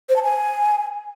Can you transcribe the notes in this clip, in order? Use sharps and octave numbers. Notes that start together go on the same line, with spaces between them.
C5
A5
G#5